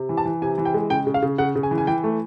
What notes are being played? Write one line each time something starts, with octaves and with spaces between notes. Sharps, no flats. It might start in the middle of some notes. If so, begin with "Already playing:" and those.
Already playing: C3
E3
A5
E3
C3 G#5
E3
G5
G#3
C#3 G5
C#3
F5
C#3
C#3 F#5
C#3
G#5
E3
G#5
E3 G5
A3